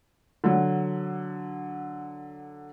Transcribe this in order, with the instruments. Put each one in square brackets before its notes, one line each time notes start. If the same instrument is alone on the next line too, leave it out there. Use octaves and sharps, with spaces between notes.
[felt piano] D3 F#3